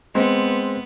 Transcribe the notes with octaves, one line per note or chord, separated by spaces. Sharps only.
G#3 B3 C4